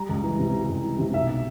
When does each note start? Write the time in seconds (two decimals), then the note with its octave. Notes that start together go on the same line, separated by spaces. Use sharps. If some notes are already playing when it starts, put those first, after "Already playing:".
Already playing: G3 A#5
0.09 C#2
0.23 E3
0.39 C3
0.54 G3
0.69 C#2
0.84 E3
0.99 C3
1.14 B1 E5